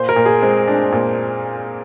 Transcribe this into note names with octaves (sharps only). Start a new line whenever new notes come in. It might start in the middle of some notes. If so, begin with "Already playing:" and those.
Already playing: A#2 C5
A#4
A#2
G#4
G#3 C4
D4
A#2